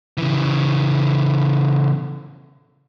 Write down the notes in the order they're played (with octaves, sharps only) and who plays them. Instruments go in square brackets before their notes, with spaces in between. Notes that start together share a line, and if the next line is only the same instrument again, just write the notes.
[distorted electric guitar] C#3 E3